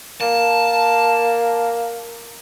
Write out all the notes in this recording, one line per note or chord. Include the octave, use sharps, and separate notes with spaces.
A#3 A5